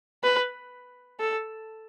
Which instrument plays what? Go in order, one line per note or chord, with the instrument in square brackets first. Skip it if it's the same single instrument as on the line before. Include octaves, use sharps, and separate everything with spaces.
[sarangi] B4
A4